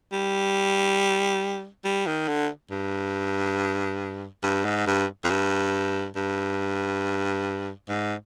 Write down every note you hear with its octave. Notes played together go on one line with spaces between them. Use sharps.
G3
G3
D#3
D3
G2
G2
G#2
G2
F2
G2
G2
G#2